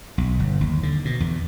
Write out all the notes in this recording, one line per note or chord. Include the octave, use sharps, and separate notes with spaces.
B1
G1
D#2
D3
B2
E2